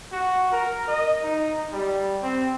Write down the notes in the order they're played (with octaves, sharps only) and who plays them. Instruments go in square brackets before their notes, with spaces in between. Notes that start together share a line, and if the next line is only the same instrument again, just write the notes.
[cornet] F#4
A#4
D#5
D#4
G3
C4